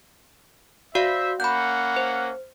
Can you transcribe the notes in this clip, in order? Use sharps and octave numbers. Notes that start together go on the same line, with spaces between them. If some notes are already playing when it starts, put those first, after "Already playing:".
F#4 C5 D5 E5 F5
A#3 C#4 F#5 B5 G6
C5